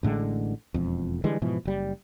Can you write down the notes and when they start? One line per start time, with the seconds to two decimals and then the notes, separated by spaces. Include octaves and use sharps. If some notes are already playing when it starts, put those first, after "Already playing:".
0.03 A1 A2 D3 G#3
0.74 E1 F2
1.24 D3 E3 G3 G#3
1.42 G#2 B2 E3 F3
1.65 F#1 G3